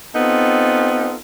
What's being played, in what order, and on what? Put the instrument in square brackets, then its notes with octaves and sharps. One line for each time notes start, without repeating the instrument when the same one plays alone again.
[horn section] B3 C4 D#4 F4 A4